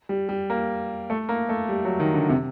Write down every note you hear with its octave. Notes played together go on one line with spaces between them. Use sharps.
G3
G3
A#3
A3
A#3
A3
G3
F#3
D#3
D3
C3